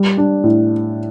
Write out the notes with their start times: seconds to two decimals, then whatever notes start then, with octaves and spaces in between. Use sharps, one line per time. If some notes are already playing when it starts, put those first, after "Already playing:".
Already playing: G3
0.17 D4
0.44 A2